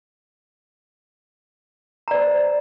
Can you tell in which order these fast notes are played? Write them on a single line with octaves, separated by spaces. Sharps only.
A#5 D5 C5